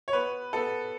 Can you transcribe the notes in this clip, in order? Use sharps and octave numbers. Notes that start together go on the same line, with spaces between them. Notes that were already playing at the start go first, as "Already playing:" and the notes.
C#5
B3 B4
B3 A4